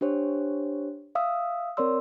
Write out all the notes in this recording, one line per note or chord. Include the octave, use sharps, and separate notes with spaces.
D4 G4 C5 C#5
E5 F5 D#6 E6
C4 A#4 C#5 D5 C6 E6